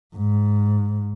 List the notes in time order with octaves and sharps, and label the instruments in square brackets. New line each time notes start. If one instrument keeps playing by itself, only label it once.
[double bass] G#2